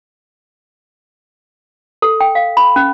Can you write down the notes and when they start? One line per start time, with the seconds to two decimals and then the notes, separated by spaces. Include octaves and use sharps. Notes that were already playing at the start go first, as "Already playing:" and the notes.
2.02 A4
2.20 G5
2.35 F5
2.57 B5
2.76 C#4